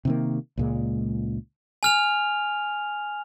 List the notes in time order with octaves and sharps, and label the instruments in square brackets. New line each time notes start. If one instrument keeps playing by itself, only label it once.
[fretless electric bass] C3 D#3 A#3
C#2 A#2 G#3
[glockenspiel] G#5 F6 F7